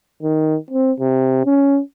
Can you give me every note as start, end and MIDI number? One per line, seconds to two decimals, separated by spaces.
0.22 0.57 51
0.71 0.92 60
1.00 1.43 48
1.45 1.80 61